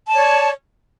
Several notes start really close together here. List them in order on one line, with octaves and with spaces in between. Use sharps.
A5 D5 C#5